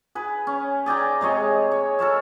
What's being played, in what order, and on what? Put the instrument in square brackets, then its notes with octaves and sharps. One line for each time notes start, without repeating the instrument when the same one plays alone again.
[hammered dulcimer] G#4 B4
C#4
G#4 D5 G5 A#5
C3 G#3 C#5 D#5
C#5
A4 A#4 C#5 E5